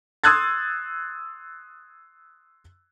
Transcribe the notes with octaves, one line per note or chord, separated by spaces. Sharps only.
C6 D#6 E6 F#6 G#6 A6